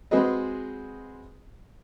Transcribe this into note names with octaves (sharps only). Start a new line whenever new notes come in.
G#3 C4 F#4 G#4 B4 D#5